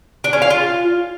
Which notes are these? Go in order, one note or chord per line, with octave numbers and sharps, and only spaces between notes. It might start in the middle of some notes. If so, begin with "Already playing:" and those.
D4
C#4
F5
F4